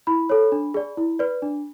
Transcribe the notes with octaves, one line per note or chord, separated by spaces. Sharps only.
E4 B5
A4 C#5
D4
G#4 D5
E4
B4 D5
D4